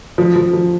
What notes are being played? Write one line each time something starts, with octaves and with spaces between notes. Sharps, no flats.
F3
F3
F3